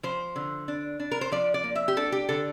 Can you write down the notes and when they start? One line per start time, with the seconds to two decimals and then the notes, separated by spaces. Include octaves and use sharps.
0.03 F3 C5
0.36 D3
0.68 D4
1.00 D4
1.11 A#4
1.21 C5
1.32 F3 D5
1.54 D5
1.64 A#3
1.76 E5
1.88 G4
1.97 D4 A4
2.12 G4
2.29 D3 A4